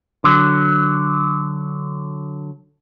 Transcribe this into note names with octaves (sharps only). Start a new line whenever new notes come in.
D3 F#3